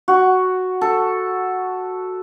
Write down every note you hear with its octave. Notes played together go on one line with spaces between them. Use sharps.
F#4
A4